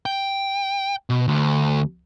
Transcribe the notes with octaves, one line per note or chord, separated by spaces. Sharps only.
G5
B2
D2